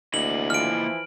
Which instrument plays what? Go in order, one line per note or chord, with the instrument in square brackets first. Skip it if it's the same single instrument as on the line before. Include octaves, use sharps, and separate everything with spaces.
[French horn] D2 [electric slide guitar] A#3 E4 D#5 [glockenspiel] F#7
[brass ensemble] E3 F3 [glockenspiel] F6 D7